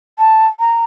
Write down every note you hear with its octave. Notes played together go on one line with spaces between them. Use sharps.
A5
A#5